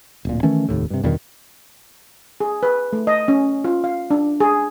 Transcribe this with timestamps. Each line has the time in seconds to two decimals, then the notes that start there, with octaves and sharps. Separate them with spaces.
0.25 D1 A#2
0.43 D#3 E3 A3 C#4
0.69 F1 D#2 A2
0.90 G2 C3
1.03 E2 G2 B2 D#3
2.40 G#4
2.63 B4
2.93 A3
3.07 D#5
3.28 C#4
3.64 F4
3.84 F5
4.11 D4
4.40 G#4